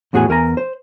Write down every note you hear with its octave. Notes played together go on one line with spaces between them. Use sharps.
E2 A2 F#4 G#4 F#5 G#5
E2 A#4 G#5 A#5
C5